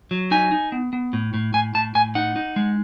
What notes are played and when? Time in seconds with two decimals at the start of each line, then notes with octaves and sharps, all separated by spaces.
0.11 F#3
0.31 D#4 G#5
0.52 D#4
0.72 B3
0.93 B3
1.13 A2
1.34 A2
1.54 A2 G#5
1.74 A2 A5
1.95 A2 G#5
2.15 D#4 F#5
2.36 D#4
2.56 G#3